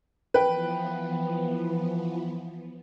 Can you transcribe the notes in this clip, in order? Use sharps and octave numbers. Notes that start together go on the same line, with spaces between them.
E3 F3 B3 B4 G5